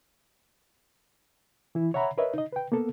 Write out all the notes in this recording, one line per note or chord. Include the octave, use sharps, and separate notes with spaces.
E3 E4
C#5 E5 F#5 A#5 B5
A#4 B4 C#5 D#5 E5
D#4 D#5
B4 G5
A#3 B3 A4